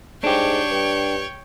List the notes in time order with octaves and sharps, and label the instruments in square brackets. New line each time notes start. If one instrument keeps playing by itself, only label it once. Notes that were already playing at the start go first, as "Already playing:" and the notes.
[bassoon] G#2 [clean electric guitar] D4 G4 [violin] C#5 G5
[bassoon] G2